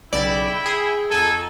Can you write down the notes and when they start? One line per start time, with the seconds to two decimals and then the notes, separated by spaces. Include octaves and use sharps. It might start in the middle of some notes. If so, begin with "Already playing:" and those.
0.13 B1 C#3 E4 D5 E5 G5 B5
0.66 G#4
1.11 F2 D#4 F#4 A4 G#5